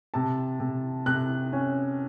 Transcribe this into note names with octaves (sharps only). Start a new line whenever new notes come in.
C3 A5
C3
C3 F#6
C#4